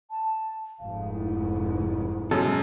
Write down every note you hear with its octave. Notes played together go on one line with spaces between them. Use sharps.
A5
F1 G#2 F5
E4
F#2 B2 G#3 A4